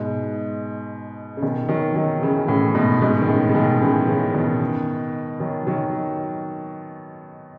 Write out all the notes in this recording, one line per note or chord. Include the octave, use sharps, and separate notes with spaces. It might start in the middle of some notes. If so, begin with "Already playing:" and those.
Already playing: G#2 B2
C#3
B2 D#3
D#3 F#3
D#3 F#3
C#3 E3
A2 C#3
G#2 B2
G#2 B2
D#3
A2 C#3
C#3
B2 D#3
C#3 E3
C#3 E3
B2 D#3
D#3 F#3
D#3 F#3